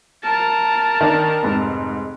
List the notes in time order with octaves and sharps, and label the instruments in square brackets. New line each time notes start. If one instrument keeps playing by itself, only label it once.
[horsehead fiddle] A#4 A5
[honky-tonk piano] D#3 D4
F1 G#2